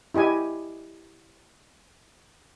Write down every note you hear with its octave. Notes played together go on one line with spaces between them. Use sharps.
E4 G4 D#5 G#5